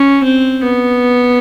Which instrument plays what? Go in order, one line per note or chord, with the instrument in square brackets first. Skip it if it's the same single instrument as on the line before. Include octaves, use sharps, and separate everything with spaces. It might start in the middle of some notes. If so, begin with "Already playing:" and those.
Already playing: [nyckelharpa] C#4
C4
B3